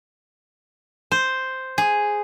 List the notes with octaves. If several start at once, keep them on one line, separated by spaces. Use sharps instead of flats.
C5
G#4